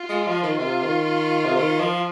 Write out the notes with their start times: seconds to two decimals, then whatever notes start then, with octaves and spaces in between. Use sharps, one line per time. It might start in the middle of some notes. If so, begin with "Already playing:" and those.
Already playing: F4
0.09 G#3
0.27 F3
0.43 D#3
0.58 C3 F4
0.83 D#3
1.45 C3
1.57 D#3
1.80 F3